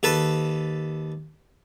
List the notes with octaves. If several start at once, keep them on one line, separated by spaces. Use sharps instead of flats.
D#2 A4 B4 A5